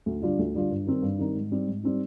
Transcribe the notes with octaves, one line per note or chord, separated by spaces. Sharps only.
D2
D3 G3 D4 F4
D2
D3 G3 D4 F4
G2
D#3 G3 C4 D#4
G2
D#3 G3 C4 D#4
G#2
G3 C4 D#4
G#2
G3 C4 D#4